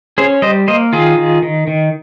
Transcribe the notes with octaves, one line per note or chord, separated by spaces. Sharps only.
C#4 G#4 C5
G3 C5 D#5
A#3 C5 D#5
D#3 F4 G#4
D#3
D#3
D#3